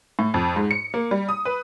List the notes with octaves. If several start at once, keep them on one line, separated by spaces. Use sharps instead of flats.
A2
F2
G#2
C#7
A#3
G3
D#6
B4